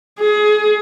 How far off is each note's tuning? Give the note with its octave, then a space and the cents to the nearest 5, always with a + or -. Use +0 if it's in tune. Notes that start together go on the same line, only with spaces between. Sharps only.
G#4 +25